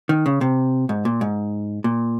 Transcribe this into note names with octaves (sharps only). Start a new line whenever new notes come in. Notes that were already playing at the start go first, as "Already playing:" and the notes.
D#3
C#3
C3
G#2
A#2
G#2
A#2